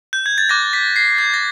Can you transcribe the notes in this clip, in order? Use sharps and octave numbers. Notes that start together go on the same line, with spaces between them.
G6
G#6
A6
D6 F#6 A#6
B6
C7
G#6
A#6